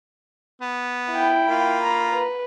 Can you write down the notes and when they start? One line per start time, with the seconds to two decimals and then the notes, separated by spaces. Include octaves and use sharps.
0.62 B3
1.12 E4 G5
1.47 A#3 F4 B5
1.81 A#5
2.13 B4